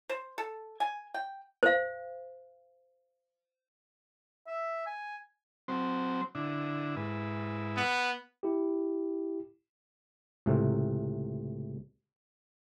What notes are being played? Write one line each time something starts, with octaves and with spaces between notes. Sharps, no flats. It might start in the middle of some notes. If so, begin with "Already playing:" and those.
C5
A4
G#5
G5
C5 F5
E5
G#5
F#3 C4 C5
D3 D4 E4
G#2 E4 B4
B3
E4 G4
C#2 A2 C3